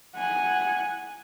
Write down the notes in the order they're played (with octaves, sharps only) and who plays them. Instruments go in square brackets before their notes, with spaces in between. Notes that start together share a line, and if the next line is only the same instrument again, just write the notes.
[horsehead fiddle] F#5 G#5